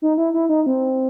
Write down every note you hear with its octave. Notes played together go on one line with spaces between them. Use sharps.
D#4
E4
E4
D#4
C4